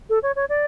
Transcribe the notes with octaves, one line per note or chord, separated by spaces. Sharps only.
A4
C#5
C#5
D5